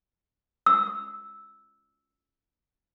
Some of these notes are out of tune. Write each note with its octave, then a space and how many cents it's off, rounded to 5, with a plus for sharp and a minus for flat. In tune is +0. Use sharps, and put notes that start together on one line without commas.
E6 -5